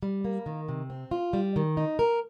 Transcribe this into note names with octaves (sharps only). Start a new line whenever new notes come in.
G3
A#3
D#3
C3
C4
F4
G3
D#3
D#4
A#4